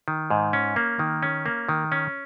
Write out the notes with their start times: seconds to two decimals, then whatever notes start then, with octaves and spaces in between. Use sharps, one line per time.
0.08 D#3
0.30 G#2
0.53 C#4
0.76 A#3
0.99 D#3
1.23 C#4
1.46 A#3
1.69 D#3
1.92 C#4